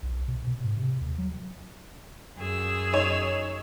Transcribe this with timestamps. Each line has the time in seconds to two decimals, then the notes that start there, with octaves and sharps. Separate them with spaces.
0.02 B1
0.28 B2
0.47 B2
0.64 G#2
0.76 C3
1.01 D#2
1.18 F#3
2.37 F#2 G#4 E6
2.93 D#4 C#5